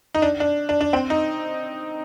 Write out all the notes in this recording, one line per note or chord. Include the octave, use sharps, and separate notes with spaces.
D#4
D4
D4
D4
D4
C4
D#4